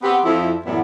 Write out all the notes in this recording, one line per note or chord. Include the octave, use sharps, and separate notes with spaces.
B3 C4 G4
F2 F3 E4
F#2 A2 E3 G3 B3 E4